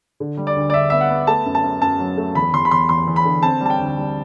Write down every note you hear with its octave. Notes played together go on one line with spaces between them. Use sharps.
D3
G3
D5
D2
D5
D2 E5
B3 E5
F#5
B3
A3 A5
F#2
A5
F#2
F#2 A5
F#3
A3
E2 B5
E2 C6
B5
E2 C6
E2 C6
E2
B5
D3
C4 A5
G3 A5
G5
D2
G3